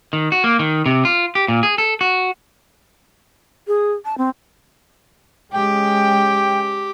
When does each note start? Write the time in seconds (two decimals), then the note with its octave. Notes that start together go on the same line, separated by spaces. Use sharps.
0.13 D#3
0.32 F#4
0.44 A#3
0.59 D#3
0.86 C3
1.05 F4
1.35 G4
1.48 A#2
1.63 G#4
1.78 A4
2.01 F#4
3.67 G#4
4.05 A5
4.18 C4
5.53 G#3 C#4 G4 G5